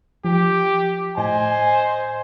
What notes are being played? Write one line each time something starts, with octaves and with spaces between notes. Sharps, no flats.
F3 G4
A2 C5 D#5 G#5